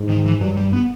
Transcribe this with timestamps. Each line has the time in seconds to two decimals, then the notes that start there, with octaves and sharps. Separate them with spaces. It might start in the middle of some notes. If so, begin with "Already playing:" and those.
Already playing: G#2
0.09 D#3
0.26 E3
0.41 G2 F#3
0.57 G3
0.73 B3